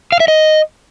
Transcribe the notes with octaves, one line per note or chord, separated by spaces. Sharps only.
F5
E5
D#5